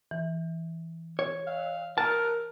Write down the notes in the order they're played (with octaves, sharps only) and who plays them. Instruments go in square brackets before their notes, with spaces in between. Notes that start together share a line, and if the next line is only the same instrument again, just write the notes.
[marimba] E3
[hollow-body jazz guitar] C#5
[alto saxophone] F5
[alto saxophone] A#4 [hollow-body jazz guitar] A5